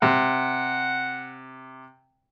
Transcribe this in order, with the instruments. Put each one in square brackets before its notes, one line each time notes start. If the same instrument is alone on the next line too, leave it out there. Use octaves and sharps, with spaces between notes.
[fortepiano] C3 [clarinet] F#5